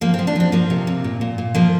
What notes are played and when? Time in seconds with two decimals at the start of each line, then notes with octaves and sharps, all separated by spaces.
0.01 F3 A#3
0.14 C4
0.19 F3
0.27 D4
0.36 F3 C4
0.52 F3 A#3
0.70 C3
0.87 C3
1.04 A#2
1.21 A#2
1.38 A#2
1.55 F3 A#3